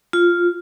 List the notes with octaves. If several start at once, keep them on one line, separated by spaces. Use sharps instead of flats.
F4